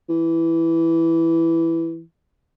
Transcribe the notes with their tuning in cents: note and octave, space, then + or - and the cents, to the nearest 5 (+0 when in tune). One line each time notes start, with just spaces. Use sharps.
E3 +5